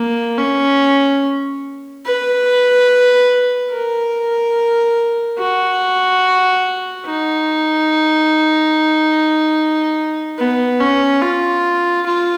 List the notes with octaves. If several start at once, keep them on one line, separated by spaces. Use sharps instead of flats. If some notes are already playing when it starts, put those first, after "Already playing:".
Already playing: A#3
C#4
B4
A#4
F#4
D#4
B3
C#4
F4
F4